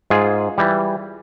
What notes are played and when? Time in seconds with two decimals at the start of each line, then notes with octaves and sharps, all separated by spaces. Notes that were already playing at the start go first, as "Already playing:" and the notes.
0.10 G#2 F4 G#4
0.58 E3 G3